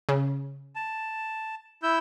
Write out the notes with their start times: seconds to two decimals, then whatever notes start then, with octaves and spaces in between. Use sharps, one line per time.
0.09 C#3
0.76 A5
1.83 E4 E6 G6